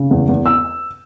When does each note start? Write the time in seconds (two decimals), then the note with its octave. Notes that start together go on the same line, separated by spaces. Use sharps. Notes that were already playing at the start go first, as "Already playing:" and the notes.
Already playing: C#3
0.11 E2
0.29 E2
0.46 E6